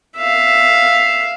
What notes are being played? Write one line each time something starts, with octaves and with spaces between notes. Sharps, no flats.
E5 F5